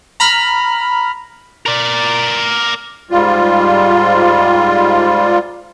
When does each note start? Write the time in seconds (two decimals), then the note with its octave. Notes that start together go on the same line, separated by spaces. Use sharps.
0.20 A#5 B5 F6
1.66 A#4 D5
3.11 G#2 G3 F4